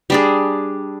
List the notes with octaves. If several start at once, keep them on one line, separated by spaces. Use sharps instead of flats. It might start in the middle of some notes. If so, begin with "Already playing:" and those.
G3 D4 G#4